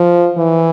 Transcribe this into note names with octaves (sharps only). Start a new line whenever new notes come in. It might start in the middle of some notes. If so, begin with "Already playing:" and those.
Already playing: F3
E3